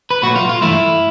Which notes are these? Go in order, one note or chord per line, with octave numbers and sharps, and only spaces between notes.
B4
A#2 F#3 A3 F#4
F4
F4
G2 E3 A3 E4